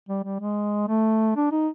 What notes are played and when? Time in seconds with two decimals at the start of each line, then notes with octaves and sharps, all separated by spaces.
0.09 G3
0.24 G3
0.40 G#3
0.88 A3
1.36 D4
1.51 D#4